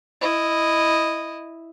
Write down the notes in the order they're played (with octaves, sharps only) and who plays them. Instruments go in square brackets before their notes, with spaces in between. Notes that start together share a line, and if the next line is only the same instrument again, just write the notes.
[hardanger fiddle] E4 D#5